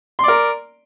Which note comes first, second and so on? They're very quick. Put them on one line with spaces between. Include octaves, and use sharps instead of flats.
C6 D5 A#4